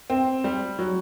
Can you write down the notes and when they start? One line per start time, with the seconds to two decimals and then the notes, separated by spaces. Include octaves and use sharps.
0.10 C4
0.44 G3
0.79 F#3